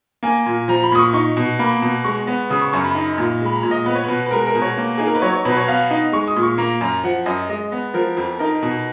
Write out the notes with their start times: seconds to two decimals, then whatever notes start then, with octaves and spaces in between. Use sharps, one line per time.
0.23 A#3 G#5
0.46 A#2
0.68 F3 A#5
0.83 B5
0.92 A#2 D#6
0.99 C#6
1.13 D#4 C#6
1.37 B2
1.59 A#3 B5
1.82 B2
2.04 G#3 C#6
2.27 B3
2.50 C#3 D#6
2.62 C#6
2.73 F#2 C#6
2.84 B5
2.95 D#4
3.18 A#2
3.41 G#3 B5
3.56 A#5
3.63 A#2
3.71 D#5
3.86 B3 B4
3.95 C#5
4.04 B2 B4
4.26 B4
4.31 G#3 A#4
4.47 A#4
4.55 B2
4.62 C#5
4.78 A#3
4.98 D#4 G#4
5.07 A#4
5.15 B4
5.22 F#3 C#5
5.33 C#5
5.45 B2 B4
5.57 C#5
5.68 B3 F5
5.91 D#4
6.12 G#3 C#6
6.28 D#6
6.36 A#2
6.43 C#6
6.58 A#3 A#5
6.81 F#2 A#5
7.03 F3 F#5
7.26 F#2 D#5
7.49 G#3 D#5
7.72 B3
7.94 F3 A#4
8.17 F2
8.39 D#4 A#4
8.63 B2